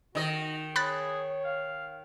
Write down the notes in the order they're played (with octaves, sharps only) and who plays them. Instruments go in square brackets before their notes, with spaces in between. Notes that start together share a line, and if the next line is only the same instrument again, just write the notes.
[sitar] D#3 D#5 [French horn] D#4 [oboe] F#4
[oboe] G#4 [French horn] C#5 [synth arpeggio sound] B5 F#6 A6
[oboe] F5